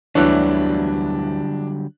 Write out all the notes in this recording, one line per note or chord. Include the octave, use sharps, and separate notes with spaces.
D2 D3 E3 F#3 G3 D4 C#5 F#6